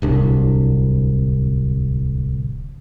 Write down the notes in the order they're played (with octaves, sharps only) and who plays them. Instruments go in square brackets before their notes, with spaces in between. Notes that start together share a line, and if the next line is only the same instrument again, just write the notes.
[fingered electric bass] D1 C2 D4